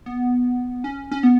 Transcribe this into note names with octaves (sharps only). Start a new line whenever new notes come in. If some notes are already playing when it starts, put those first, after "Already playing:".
B3
C#4
C#4
B3